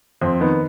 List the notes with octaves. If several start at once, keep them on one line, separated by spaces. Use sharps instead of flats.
F2 C4
D#3 B3